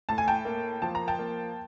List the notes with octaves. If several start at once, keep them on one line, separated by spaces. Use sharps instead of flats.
A2 A5
G#5
G5 A5
A#3
F3 A5
A#5
G5 A5
A#3